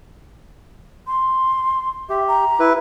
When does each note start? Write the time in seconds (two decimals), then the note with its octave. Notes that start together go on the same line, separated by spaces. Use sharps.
1.07 C6
2.09 G4 E5
2.28 A#5
2.59 E4 B4